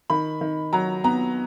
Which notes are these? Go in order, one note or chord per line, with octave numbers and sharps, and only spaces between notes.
D#3 B5
D#3
F#3 A#5
B3 A#5